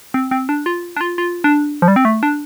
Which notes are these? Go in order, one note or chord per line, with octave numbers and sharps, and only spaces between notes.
C4
C4
D4
F4
D4
F4
F4
D4
F3
G3
C4
A3
D4